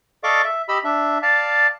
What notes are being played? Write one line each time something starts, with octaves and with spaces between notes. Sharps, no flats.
A4 D5 D#5 F5 C#6 D6
E5
G4 D#5 B5 E6
D4 E5
D5 F5 A5